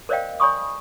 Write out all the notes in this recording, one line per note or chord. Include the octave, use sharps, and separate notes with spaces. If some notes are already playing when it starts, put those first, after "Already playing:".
A#4 C5 D5 D#5 F5 G5
D5 G#5 B5 C#6 D#6